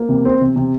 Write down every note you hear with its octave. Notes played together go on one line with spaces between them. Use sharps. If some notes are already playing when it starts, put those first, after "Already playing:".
Already playing: A#3
C3
C4
C3
C3